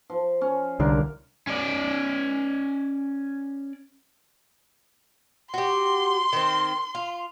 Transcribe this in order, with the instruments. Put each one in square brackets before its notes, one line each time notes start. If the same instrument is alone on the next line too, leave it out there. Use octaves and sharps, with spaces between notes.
[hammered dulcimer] F3
C#4
[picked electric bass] C2 D3 [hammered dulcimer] A#4 F5
[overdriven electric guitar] C#4 D5
[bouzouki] F#4 G4 [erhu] C6
[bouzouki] D#3 C4
F4